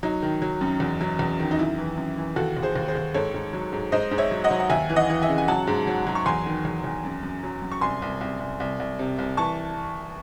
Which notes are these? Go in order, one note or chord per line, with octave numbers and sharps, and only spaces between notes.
F#3 D#4
D#3
F#3
F#2
E2
F#3
E2
D#3
D#4
F#2 E4
E3
F#2
E3
D#2 F#4 A4
D#2
G#4 C5
D#2
G#4 C5
D#2
G#2 A4 C#5
G#2
F#3
G#2
G#2 C5 D#5
G#2
C#5 E5
F#3
D#5 F#5
F#3
F#5
D#2 E5 G#5
E3
D#5 F#5
E3
E5 G#5
C#3
G#5
F#3 F#5 A5
G#2
F#3
F#3
C#6
E2 G#5 C6
D#3
E2
E2
F#2
F#2
F#3
F#2
C#6
C2 G#5 C6
C2
C2
C2
C2
C2
C3
C2
E3 A5 C#6